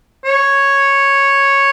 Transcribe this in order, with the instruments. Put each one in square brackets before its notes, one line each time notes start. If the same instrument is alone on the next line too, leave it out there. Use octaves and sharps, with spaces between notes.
[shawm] C#5